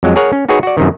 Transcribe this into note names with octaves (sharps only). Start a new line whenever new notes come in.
F2 F#3 G#3
G#4 A#4 C#5 F#5 A#5
C#4
D#4 F#4 G#4 B4 C#5
F#4 D5
F#2 C3 D#3